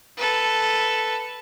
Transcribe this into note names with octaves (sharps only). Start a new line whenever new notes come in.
A4 B4